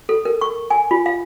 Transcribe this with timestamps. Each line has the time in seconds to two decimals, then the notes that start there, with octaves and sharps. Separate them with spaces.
0.09 A4
0.25 A#4
0.41 C#6
0.70 G#5
0.91 F4
1.06 F5